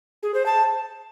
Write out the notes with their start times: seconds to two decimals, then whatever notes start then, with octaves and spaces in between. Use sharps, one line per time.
0.23 G#4
0.34 C5
0.46 A5